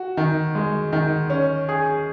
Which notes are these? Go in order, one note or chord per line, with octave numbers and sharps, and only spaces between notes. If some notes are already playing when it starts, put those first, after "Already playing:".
Already playing: F#4
D#3
G#3
D#3
C#4
G#4